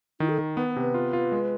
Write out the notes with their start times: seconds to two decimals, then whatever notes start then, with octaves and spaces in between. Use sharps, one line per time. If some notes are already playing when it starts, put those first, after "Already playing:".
0.20 D#3 E4
0.29 A4
0.38 D#3
0.57 B3 B4
0.76 C3
0.81 B4
0.94 F4
1.13 F4
1.32 G#3